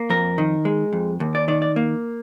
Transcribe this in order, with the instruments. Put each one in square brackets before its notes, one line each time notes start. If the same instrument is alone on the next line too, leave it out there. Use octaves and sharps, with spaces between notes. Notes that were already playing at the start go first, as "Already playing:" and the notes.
Already playing: [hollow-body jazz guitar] A#3
F2 A#4
D#3
G#3
F2
D#2
D5
D#3 D5
D5
A#3